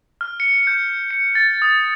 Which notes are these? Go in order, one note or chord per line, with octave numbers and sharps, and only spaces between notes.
F6
C#7
G6
C#7
A6
D#6